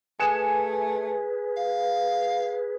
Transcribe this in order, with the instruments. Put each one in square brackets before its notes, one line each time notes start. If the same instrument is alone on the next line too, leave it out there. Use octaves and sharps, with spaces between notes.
[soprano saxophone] A3 [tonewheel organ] G#4 B4 [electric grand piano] G#5 C#7 E7
[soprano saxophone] F5